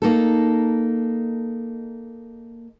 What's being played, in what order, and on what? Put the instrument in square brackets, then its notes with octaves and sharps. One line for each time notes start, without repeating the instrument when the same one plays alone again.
[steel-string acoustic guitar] A#3 D#4 A4